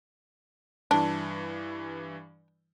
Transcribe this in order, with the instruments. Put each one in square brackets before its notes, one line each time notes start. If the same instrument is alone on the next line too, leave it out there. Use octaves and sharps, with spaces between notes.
[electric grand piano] G2 E3 [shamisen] D4